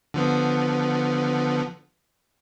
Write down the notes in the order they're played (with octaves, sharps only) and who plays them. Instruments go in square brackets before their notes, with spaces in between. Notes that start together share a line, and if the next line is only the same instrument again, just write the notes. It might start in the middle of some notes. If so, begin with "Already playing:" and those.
[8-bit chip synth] D3 F3 B3